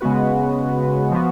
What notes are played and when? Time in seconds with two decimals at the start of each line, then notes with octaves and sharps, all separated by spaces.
0.01 C#3 G#3 B3 F#4 B4
1.11 F3 B3 F#4